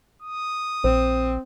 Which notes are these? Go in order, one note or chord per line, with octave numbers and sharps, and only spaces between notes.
D#6
A#1 C4 C5